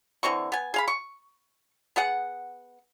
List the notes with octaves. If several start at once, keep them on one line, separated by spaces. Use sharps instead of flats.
D3 E3 C4 C#6
B3 G#5
G#4 F5 B5
C#6
B3 G#4 F#5